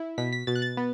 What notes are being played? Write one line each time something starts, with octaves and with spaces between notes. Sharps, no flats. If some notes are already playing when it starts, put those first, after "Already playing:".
Already playing: E4
B2 B6
B6
B2 A6
F#6
A6
B3